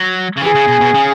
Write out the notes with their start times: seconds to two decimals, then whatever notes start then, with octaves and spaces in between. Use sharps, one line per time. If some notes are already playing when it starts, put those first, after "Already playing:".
Already playing: F#3
0.37 C#3
0.42 E3 G#4
0.55 C#3
0.68 B2
0.81 B2
0.94 C#3